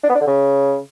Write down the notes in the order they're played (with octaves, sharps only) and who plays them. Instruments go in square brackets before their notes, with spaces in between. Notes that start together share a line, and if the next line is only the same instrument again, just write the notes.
[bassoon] D4
B3
D4
D3
C#3